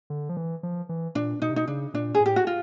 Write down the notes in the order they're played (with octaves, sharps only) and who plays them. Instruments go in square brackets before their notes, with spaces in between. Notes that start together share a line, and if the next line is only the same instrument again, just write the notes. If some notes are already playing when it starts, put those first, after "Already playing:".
[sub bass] D3
F3
E3
F3
E3
[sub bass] A#2 [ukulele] D4
[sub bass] B2 [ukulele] D#4
[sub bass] C3
[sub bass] B2 [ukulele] D#4
[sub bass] C#3 [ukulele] D4
[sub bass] A#2 [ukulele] D4
[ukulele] G#4
[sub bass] A2
[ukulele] G4
F#4
F4